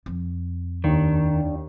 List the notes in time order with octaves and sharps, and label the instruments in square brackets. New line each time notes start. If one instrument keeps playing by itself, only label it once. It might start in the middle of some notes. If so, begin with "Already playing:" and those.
[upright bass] F2
[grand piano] D#2 [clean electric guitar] D#3 [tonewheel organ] D4